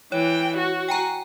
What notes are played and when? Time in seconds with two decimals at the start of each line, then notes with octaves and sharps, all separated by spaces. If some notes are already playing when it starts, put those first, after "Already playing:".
0.12 E3 C#5 G5
0.57 F#4
0.88 G5 G#5 A#5